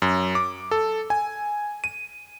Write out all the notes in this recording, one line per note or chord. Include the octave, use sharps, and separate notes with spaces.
F#2
D6
A4
G#5
D#7